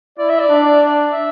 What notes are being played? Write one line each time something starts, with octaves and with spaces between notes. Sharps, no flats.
E4 D5
E5
D5
D4
E5